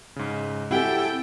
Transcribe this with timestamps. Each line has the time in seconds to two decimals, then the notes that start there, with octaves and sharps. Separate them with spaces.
0.16 G#2 C#3
0.71 C4 E4 F#4 G4 A4 G5 G#5